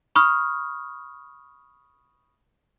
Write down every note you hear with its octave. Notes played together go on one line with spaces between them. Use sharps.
B5 C#6 D#6 F6